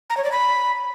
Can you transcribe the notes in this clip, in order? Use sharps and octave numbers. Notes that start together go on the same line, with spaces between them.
A#5
C#5
D5
B5